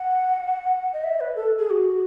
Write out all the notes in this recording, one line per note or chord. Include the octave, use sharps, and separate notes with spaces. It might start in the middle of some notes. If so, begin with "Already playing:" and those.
Already playing: F#5
D#5
E5
B4
A4
G#4
F#4